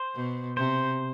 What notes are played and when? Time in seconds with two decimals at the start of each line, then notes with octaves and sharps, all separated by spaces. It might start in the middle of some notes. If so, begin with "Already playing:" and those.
Already playing: C5
0.15 B2
0.57 C3 C5